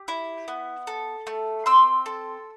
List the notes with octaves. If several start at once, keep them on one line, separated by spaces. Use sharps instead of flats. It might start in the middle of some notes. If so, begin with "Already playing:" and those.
Already playing: G4
E4
B3
A4
A3
C4 C6 E6
A4